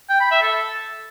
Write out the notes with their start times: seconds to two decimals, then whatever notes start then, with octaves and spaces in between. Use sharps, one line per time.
0.10 G5
0.20 B5
0.31 E5
0.42 A4